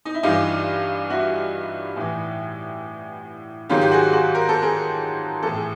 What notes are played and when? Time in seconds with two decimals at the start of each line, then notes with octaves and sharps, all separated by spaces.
0.05 D#4
0.14 E4
0.23 G2 E3 D#4 F4
1.10 E4 F#4
1.97 A2 E3
3.69 G#2 D#3 F#3 F4 G4
3.81 G4
3.91 F#4 G#4
4.13 F#4 G#4
4.35 A#4
4.49 A4
4.62 G#4 A#4
5.42 A2 E3 A4
5.55 G#4